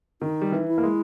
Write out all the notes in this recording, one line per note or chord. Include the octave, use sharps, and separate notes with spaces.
D#3 D#4
G3
E3
E4
A#3
G#3